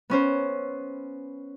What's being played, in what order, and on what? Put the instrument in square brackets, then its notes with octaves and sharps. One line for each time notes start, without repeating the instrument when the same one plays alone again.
[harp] B3 C#4 C5